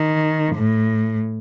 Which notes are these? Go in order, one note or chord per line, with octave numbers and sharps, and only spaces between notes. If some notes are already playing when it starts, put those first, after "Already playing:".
Already playing: D#3
A2